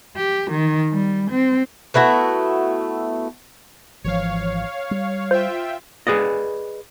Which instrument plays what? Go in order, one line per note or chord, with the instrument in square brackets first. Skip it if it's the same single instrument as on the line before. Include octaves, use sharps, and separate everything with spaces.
[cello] G4
D#3
G3
C4
[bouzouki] A3 B3 E4 F#4
[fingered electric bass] G#1 E3 F3 [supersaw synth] C#5 F5
[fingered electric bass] G3
[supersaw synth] F4 E5 G5 [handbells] C5
[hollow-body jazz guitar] G#4 B4 D5 D#5